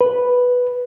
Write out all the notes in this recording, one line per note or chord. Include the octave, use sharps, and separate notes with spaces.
B4